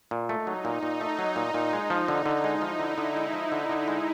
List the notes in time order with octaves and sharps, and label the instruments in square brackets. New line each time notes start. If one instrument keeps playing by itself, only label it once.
[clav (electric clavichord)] A#2
[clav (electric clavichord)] A3 [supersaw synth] D#4
[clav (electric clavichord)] F#3
A#2
A#2
A3
F#3
A#2
A#2
[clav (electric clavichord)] G#3 [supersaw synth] D#4
[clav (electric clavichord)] F3
D3
D3
[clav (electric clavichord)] G#3 [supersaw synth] E4
[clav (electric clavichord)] F3
D3
D3
G#3
F3
D3
D3
G#3